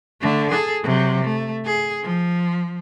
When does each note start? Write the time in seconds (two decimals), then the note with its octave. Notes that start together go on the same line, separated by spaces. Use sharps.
0.21 D3 A3
0.51 G#4 A4
0.83 C3 F#3
1.23 A3
1.66 G#4
2.03 F3